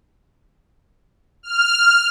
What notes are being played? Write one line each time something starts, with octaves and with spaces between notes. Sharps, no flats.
F6